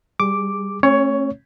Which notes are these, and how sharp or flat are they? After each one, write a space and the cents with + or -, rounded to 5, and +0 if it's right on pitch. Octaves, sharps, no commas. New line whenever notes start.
G3 +0 G#4 -20 D6 +0
A3 +20 C#4 -35 C#5 +10